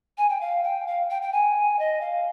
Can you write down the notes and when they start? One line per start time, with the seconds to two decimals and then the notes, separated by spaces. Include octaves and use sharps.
0.18 G#5
0.29 G5
0.41 F5
0.63 G5
0.87 F5
1.10 G5
1.22 G5
1.33 G#5
1.79 D#5
2.01 F5